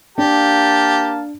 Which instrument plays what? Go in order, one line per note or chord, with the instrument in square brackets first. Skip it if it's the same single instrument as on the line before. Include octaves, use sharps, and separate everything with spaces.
[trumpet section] A#3 F5 A5 [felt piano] D4 [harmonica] G4